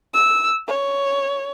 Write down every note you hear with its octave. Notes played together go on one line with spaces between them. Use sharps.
E6
C#5